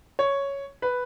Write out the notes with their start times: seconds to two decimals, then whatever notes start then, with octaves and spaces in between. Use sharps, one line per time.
0.19 C#5
0.82 B4